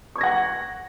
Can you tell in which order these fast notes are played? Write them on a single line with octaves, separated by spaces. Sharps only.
C#6 G#6 A#6 F#5